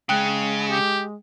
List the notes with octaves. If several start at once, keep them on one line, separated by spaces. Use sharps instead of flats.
C#3 G#3 G5 F#6
G4